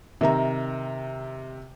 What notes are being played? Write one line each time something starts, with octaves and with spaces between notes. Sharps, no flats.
C3 D#3 E5 A#5